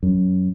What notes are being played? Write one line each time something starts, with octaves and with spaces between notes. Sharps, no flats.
F#2